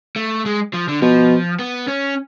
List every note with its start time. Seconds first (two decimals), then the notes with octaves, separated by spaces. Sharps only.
0.16 A3
0.46 G#3
0.74 F3
0.88 D3
1.02 B2 F3
1.59 B3
1.88 C#4